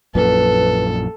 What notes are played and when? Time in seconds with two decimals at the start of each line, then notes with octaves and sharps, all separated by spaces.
0.15 A#1 F#2 A#2 A4 B4